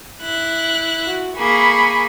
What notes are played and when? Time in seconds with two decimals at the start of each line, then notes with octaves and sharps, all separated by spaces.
0.22 E4 F#6
1.06 F#4
1.37 A#3 G#4 B5 C#6